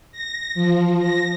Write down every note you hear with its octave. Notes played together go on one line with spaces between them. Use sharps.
A#6
F3
A#6